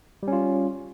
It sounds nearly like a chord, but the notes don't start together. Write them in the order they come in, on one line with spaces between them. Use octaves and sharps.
G3 C#4 F4